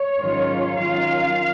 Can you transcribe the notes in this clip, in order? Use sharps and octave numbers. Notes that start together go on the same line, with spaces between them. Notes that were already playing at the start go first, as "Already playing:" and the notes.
Already playing: C#5
G#2 D#3 F#3 C#4 F4
D#3 F#3 C#4 F4 F5